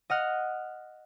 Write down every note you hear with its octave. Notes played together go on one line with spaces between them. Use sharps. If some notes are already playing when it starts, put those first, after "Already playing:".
D#5 F#5 F6